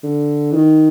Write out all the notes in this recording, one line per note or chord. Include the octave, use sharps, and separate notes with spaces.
D3
E3
D#3